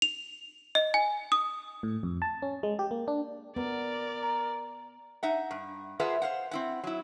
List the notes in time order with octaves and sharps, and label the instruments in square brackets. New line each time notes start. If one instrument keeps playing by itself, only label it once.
[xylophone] F7
D#5
G#5
D#6
[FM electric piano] A2
F2
A5
C#4
G#3
G4
A#3
D4
[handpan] B3 [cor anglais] A#4 [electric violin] D5
[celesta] A#5
[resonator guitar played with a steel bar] D#4 E5 F#5
G2
F4 G#4 A#4 B4 E5 F#5
C5 F5 F#5
C4 E4 F#5
F#3 E4